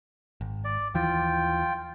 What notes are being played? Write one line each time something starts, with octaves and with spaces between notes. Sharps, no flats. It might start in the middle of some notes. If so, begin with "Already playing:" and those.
G#1
D5
D#2 E3 F3 F4 G5